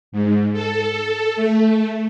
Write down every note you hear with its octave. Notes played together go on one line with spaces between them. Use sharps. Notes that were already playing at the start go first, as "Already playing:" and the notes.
G#2
A4
A3